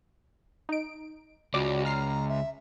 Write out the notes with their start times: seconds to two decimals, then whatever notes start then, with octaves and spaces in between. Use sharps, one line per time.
0.69 D#4 D7
1.54 C#2 F#4 D5 D6
1.85 A#5 F6 C7
2.29 E5